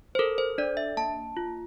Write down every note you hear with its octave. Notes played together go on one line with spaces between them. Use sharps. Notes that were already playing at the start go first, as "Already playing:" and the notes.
C5
A4 A#4
C5
D4 D5
E5
A#3 A5
F4